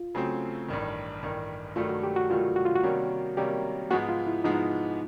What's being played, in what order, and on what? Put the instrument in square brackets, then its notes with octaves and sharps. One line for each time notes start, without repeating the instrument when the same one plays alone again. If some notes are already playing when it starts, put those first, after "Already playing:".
Already playing: [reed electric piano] F4
[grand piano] C#3 F#3 A3 C4
A1 G2 D#3
A1 G2 D#3
[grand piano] G2 D#3 F#3 A3 [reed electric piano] F4
[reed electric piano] F#4
G4
F#4
[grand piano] G2 D#3 F#3 A3 [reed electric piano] F4
[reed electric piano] F#4
F4
F#4
[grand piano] C3 D#3 G3 A#3 C#4
[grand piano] C3 D#3 G3 A#3 C#4 [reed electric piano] G4
[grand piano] G#2 F3 G#3 B3 [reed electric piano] F#4
[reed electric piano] F4
E4
[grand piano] G#2 F3 G#3 B3 [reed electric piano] D#4